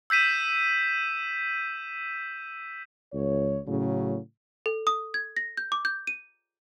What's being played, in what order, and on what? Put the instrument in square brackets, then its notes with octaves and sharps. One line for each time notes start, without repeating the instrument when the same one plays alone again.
[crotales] E6 G6 B6 D#7 E7
[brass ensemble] C#2 C#5
A2 C#3 F#3
[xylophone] A4
D#6
G#6
A#6
G6
D6
G6
D#7